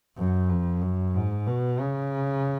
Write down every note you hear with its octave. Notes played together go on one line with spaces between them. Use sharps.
F#2
F2
F#2
G#2
B2
C#3